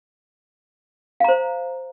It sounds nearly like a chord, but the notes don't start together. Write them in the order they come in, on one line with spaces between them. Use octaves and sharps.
F5 A#5 C5